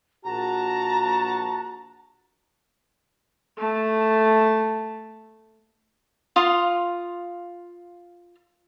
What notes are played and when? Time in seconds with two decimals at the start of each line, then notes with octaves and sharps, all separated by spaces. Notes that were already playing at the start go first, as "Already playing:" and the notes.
0.24 A#1 F#4 A5 A#5
3.57 A3 A5
6.36 F4 F5 C6 D#6